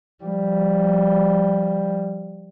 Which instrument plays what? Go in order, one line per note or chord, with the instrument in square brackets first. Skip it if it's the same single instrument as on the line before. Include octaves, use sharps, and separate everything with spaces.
[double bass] F3 G3